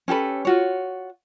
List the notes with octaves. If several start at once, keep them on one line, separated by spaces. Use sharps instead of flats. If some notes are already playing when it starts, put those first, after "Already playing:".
C#4 G4 A4 B4
F4 F#4 C#5